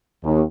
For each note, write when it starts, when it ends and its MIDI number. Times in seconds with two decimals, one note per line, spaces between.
0.23 0.41 39